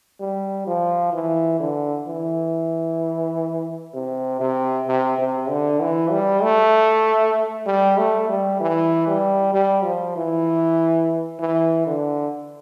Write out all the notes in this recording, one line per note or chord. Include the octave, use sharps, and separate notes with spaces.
G3
F3
E3
D3
E3
C3
C3
C3
C3
D3
E3
G3
A3
G3
A3
G3
E3
G3
G3
F3
E3
E3
D3